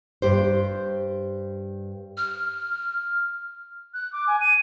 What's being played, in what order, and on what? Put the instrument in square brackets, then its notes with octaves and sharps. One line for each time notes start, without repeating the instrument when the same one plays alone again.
[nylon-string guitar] G2 G4 C5
[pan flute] F6
[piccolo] F#6
D6
G#5
D#7